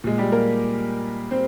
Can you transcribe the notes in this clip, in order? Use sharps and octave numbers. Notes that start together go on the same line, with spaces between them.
A#2 G#3
G3 G4
A#3 A#4
C4 C5